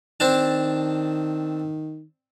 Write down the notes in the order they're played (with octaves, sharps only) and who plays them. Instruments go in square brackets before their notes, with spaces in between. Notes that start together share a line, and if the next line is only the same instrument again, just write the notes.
[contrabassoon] D#3 [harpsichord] C4 D4 A5